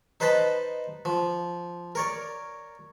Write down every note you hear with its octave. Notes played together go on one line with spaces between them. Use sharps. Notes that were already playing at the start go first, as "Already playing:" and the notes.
D#4 B4 C5 D#5 A5 B5
F3
A#4 C#5 D5